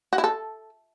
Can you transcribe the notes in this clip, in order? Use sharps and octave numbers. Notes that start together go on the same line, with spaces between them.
F#4
E4
A4